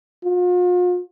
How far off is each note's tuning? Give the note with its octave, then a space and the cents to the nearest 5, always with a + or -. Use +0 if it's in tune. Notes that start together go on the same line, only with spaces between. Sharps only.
F4 +45